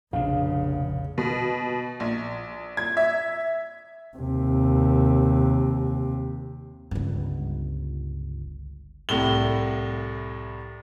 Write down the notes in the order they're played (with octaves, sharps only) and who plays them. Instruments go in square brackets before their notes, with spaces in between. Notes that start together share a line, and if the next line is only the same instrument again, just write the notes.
[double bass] F1 C#3 [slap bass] A#1 D4 [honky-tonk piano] F5
[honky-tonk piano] B2
A#1
G#6
E5
[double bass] D#2 C3
[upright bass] G1 C#2
[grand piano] C2 A2 G7